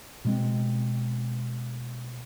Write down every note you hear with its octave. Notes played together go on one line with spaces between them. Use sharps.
B2 G#3 C4